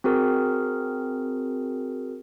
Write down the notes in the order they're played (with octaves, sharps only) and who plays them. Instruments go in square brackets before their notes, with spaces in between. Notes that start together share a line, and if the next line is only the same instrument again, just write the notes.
[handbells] C4 F#4 G#4 A#4